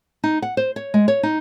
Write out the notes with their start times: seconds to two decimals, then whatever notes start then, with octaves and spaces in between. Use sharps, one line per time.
0.24 D#4
0.42 F#5
0.57 C5
0.76 C#5
0.94 G#3
1.08 C#5
1.23 D#4